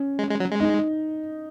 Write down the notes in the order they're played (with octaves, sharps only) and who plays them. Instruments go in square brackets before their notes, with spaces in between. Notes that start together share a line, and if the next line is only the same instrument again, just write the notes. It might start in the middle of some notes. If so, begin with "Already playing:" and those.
Already playing: [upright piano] C#4
[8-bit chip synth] G#3
G#3
F#3
G#3
[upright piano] D#4